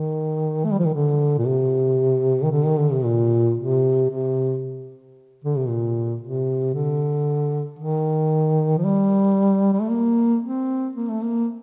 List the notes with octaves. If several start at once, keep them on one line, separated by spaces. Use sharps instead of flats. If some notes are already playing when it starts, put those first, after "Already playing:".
Already playing: D#3
A3
G3
F3
D#3
D3
A#2
C3
D#3
D3
D#3
D3
C3
A#2
C3
C3
D3
C3
A#2
C3
D3
D#3
F3
G3
G3
A3
A#3
C4
A#3
A3
A#3